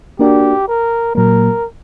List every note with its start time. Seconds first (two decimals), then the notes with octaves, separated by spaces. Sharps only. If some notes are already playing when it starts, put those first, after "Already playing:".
0.19 A#3 D4 F#4 G4 A#4 D5
0.68 A#4
1.15 A#2 F#3 A#3 A#4